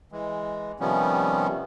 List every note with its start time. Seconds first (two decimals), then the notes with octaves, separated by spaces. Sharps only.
0.12 E3 G#3
0.80 C3 D#3 F3 G3 B3 C#4